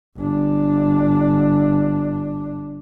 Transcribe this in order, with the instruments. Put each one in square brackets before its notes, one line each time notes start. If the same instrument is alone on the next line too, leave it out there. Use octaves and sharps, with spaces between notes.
[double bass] G1 D4